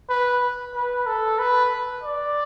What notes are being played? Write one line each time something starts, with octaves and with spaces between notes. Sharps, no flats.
B4
B4
A4
B4
D5